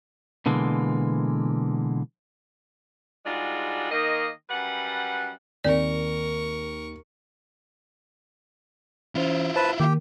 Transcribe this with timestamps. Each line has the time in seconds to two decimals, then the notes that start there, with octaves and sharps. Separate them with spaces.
0.46 B2 D3 E3 G#3 A#3
3.26 G#2 G3 G#3 D4 F4 F#4
3.91 D#3 A#3 D#5
4.50 F#2 G3 B4 F#5
5.64 D#2 C4 A#4 D5 C#6
9.15 E3 C#4 E4 F4 C5
9.56 B4 C5 A5
9.80 D#3 A#3 G4